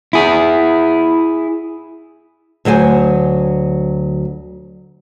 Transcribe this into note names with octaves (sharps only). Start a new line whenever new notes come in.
E4 G#4
D2 F#3 C5 G#5